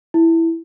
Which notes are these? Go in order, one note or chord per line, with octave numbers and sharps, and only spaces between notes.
E4